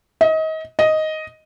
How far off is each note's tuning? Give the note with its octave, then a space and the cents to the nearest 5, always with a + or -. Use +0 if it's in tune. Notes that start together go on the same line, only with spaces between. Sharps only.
D#5 +30
D#5 +5